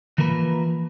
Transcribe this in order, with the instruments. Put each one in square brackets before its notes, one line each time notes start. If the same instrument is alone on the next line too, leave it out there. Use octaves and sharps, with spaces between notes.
[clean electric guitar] E3 F3 A#3 A#4 B4